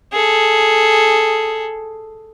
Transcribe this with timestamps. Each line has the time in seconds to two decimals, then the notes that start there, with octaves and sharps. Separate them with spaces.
0.13 G#4 A4